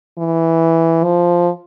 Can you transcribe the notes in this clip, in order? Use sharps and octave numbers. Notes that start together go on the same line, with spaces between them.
E3
F3